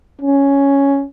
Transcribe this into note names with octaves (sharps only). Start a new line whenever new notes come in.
C#4